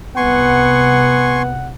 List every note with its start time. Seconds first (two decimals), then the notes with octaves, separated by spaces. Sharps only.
0.16 C2 B3 F#5 G#5 C6 C#6